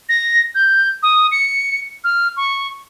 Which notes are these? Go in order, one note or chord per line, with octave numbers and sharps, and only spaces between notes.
A#6
G6
D#6
C#7
F6
C#6